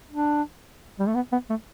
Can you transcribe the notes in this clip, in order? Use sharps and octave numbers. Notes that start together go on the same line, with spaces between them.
D4
G3
A3
B3
B3
A3